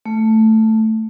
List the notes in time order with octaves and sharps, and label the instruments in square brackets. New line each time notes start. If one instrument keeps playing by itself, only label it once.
[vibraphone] A3